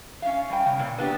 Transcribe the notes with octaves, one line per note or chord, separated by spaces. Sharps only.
C#4 F5
G3 G5
C#3
A#2
B3 D4 G4